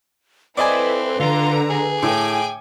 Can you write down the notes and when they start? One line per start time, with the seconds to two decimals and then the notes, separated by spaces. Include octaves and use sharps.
0.57 C4 E4 A4 B4 D5 D#5 G#5
1.20 D3 F4 A#5
1.70 G#4
2.02 A2 G5 G#5 D6